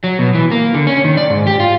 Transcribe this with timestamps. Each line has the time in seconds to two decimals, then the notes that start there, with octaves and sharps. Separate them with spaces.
0.04 F#3
0.19 B2
0.34 E3
0.51 A#3
0.74 D3
0.87 C#4
1.05 D#3
1.17 D5
1.30 G#2
1.47 G4
1.60 F4